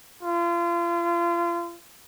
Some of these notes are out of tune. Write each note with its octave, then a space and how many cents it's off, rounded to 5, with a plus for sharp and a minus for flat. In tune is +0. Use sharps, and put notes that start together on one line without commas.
F4 -35